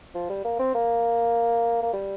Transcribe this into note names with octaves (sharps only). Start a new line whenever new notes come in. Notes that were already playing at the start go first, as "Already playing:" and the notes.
F3
G3
A#3
C4
A#3
A#3
G3